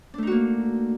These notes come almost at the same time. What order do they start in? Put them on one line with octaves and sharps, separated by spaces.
D4 A3 D#4 F#4 A#3